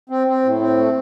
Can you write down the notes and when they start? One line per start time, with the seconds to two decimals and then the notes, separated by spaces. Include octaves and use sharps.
0.10 C4
0.27 C4
0.44 A2
0.60 C4
0.77 A3